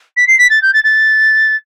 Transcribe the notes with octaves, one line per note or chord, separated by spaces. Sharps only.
B6
C7
B6
A6
G6
A6
A6